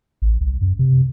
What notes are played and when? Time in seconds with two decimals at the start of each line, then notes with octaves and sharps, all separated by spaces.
0.22 A1
0.41 C2
0.61 F#2
0.79 C3